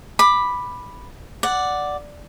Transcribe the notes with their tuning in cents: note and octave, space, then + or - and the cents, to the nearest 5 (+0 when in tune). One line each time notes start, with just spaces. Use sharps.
B5 +0 D6 +15
D5 +0 F#5 +0